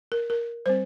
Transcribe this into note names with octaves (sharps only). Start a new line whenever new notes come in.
A#4
A#4
G3 C4 C5